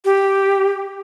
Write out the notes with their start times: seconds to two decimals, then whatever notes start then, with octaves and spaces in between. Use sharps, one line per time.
0.05 G4